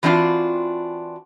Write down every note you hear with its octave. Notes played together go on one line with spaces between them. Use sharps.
E3 F#3 C4 D4 F4 F#4